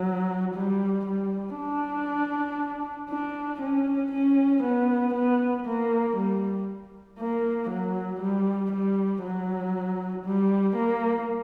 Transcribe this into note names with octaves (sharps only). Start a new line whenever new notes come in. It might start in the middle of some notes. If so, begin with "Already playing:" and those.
Already playing: F#3
G3
G3
D4
D4
C#4
C#4
B3
B3
A#3
G3
A#3
F#3
G3
G3
F#3
G3
A#3